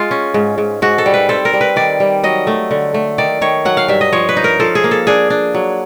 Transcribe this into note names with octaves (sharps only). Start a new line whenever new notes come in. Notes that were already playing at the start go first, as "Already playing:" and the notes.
Already playing: G#3 F4
C#4
G#2
G#2
G#2 F#4
A4
G3
B4
C4 A4
A#4
G3
B4
D#3 D5
G3
F#3 D#5
A3
D3
A3
D#3 D5
D#3 C#5
F#3 F#5
F5
G2 E5
D#5
F3 C#5
B4
D#4
A#4
F3 A4
G#4
A#3
A4
D4 G#4
D4
F#3